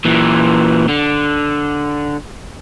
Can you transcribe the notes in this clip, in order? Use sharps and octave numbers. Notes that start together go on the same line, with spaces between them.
A#2 E3
D3